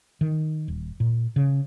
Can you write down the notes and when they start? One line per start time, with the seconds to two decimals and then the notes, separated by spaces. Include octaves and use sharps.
0.21 D#3
0.68 D#1
1.00 A#2
1.36 C#3